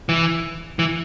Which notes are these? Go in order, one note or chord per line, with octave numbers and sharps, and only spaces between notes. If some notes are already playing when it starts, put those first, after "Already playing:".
E3
E3